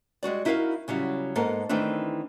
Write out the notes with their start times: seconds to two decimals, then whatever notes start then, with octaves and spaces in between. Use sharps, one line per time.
0.23 G3 G#3 F#4 D5
0.45 D#4 E4 F#4 A#4 B4 F5
0.88 C#3 F#3 G3 E4
1.36 G#2 A#3 B3 A4 A#4
1.69 D#3 E3 A3 C4 D4